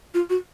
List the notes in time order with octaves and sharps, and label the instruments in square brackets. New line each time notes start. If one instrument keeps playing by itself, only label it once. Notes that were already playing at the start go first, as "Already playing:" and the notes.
[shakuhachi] F4
F#4